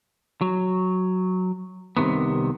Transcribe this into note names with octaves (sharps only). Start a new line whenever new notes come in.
F#3
C2 C3 D#3 B3